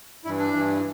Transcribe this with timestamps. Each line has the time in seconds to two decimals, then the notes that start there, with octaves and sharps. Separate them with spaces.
0.25 G2 E3 E4
0.39 D4
0.53 G2 E3